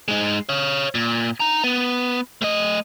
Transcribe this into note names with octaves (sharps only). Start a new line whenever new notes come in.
G#3 D#4
C#5 F5
A#2
D#4 A#5
B3
A3 D#5